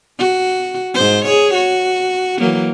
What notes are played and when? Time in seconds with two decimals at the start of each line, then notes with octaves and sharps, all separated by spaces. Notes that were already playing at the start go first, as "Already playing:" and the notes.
0.19 F#4
0.94 G#2 C5
1.25 G#4 C#5
1.54 F#4
2.39 E3 F#3 A#3